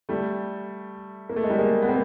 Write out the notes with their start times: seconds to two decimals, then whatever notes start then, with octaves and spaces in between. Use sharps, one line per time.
0.09 G3 A3
1.29 A#3
1.36 A3
1.44 G#3
1.50 G3 A3
1.59 G#3 A#3
1.82 B3
1.89 A#3 C4